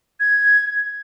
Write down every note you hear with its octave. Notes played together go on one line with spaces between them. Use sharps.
G#6